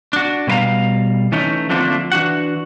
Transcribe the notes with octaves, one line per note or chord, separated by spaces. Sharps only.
D4 F#4
B2 G3 B4 F5 A#5
E3 A3 C#4 D#4
D3 F3 A3 A#3 C4 D4
E3 D4 F#4 F#5